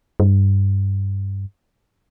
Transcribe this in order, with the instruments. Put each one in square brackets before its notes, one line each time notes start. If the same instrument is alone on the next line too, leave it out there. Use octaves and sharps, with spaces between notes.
[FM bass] G2